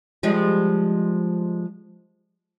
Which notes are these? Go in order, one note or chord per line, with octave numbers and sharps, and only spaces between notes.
F3 G3 G#3